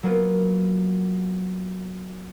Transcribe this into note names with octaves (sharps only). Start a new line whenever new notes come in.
F#3 A#3 B3 F4